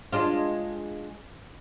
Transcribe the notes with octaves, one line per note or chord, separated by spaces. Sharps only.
G#3 D4 F4